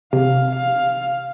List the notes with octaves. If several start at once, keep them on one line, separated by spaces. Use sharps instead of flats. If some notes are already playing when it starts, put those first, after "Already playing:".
C3 F5
F5